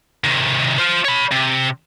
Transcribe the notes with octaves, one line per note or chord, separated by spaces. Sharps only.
C3 D#3
F4 C5
C#5 B5
C3